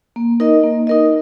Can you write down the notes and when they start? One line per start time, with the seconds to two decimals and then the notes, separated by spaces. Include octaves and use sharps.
0.16 A#3
0.40 D#4 A#4 D#5
0.64 A#3
0.87 D#4 A#4 D#5